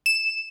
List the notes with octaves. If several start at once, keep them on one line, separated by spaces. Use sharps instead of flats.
E7